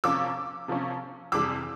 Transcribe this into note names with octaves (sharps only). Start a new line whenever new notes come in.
C3 F3 A#3 C#4 D6 E6
C3 F3 A#3 C#4
F2 C3 E3 G3 D6 E6